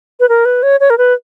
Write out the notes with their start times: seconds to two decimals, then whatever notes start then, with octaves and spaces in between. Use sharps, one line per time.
0.20 B4
0.29 A#4
0.45 B4
0.63 C#5
0.80 C#5
0.90 A#4
0.98 B4